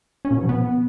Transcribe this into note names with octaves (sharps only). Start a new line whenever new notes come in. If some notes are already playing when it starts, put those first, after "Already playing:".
C#4
A#2
B2
F3
B3